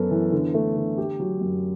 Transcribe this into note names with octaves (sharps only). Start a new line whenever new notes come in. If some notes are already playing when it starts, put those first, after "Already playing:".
Already playing: F#2 B3 A4
E3
D3
A3
D3
G4
F#3
F#2